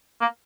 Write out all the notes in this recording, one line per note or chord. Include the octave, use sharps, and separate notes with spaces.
A#3